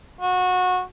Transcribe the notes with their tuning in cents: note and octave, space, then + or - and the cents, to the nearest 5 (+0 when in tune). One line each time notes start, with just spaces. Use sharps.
F#4 -20